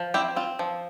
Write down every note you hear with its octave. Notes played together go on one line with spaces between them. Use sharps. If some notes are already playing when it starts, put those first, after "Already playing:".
Already playing: F3
C4 E4 G4
C4 F4
F3